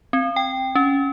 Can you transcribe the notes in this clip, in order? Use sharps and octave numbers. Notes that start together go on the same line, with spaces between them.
C4
G5
C#4